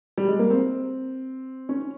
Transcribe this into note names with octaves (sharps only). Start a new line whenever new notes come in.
G3
G#3
A#3
C4
C#4